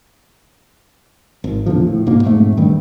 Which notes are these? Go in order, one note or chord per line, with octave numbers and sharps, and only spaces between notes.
G#1
E2 A#2 D3 F3
A2
F1 G#2 B2 A#3
F2 G#2 A3
G2 D#3 G3 A3